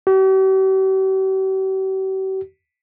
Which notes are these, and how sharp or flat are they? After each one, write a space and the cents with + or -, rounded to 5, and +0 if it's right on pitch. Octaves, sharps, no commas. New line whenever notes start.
G4 -45